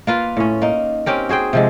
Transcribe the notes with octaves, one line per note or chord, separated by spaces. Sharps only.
A#3 F4 B4
A2 C#4
A#3 D#4
C4 C#4 G4 A#4
F#4 G#4 C5 G5
C3 F3 G#3